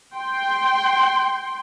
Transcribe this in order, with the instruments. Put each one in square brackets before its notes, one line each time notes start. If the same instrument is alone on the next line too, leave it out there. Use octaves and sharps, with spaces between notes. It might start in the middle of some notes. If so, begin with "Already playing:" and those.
[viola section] G5 C6